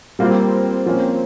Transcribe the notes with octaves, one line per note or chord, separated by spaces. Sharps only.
G3 A#3 C4 F4
F3 A#3 C#4